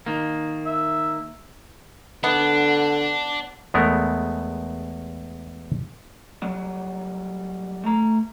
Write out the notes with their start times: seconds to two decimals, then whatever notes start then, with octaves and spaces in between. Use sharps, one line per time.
0.06 D#3 A#3
0.66 E5
2.24 D3 B3 D4
3.74 E2 G#3 A3 B3 A#4
6.42 F#3 G3 A#3
7.84 A3 A#5